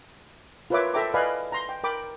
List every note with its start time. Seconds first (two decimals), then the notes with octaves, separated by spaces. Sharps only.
0.70 F4 A#4 B4 C#5 E5 D6
0.94 A4 E5 G5 A#5 D6
1.14 B4 D5 D#5 F5 G#5 B5
1.52 A#5 C6
1.69 G5
1.84 A#4 G5 B5 D6